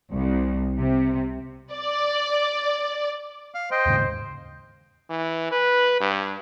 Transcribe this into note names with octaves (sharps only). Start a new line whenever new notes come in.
C2
C3
D5
F5
C5 D#5 G5
D#2 G#2 C#3
E3
B4
G2